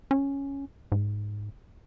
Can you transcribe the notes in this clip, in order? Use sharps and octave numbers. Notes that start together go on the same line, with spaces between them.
C#4
G#2